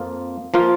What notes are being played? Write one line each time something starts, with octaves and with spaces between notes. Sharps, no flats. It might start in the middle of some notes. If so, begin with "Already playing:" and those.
Already playing: F2 F3 A#3 F4
F3 A#3 F4